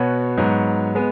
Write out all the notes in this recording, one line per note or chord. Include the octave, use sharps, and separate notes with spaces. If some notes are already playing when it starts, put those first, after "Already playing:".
Already playing: B2 B3 F#4 C#5
G#2 F#3 B3 F#4
G#3 B3